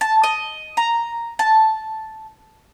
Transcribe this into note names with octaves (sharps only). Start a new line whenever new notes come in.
A5
D#5
A#5
A5